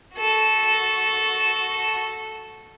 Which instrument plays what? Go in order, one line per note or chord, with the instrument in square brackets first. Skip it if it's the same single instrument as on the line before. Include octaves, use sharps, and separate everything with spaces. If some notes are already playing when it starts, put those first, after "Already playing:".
[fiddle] F#4 A4